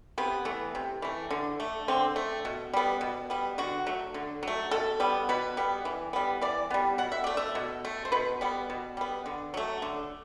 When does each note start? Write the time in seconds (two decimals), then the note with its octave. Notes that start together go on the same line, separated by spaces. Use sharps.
0.18 C3 B3
0.45 E3 A3
0.75 C3
1.02 E3 A3
1.30 D3
1.60 A3
1.88 D3 C4
2.16 A3
2.45 B2
2.73 G3 B3
3.01 B2
3.30 G3 B3
3.58 D3 F#4
3.87 F#3 A3
4.14 D3
4.43 F#3 A3
4.71 B2 A4
5.00 G3 B3
5.29 B2 B4
5.57 G3 B3
5.85 E3
6.13 G3 B3
6.41 E3 D5
6.70 G3 B3
6.98 B2 F#5
7.12 E5
7.24 A3 D5
7.37 E5
7.55 B2
7.85 A3
8.05 C5
8.12 B2 B4
8.41 G3 B3
8.70 B2
8.97 G3 B3
9.26 D3
9.54 F#3 A3
9.82 D3